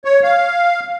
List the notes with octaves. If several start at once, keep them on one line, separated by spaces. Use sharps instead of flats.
C#5
F5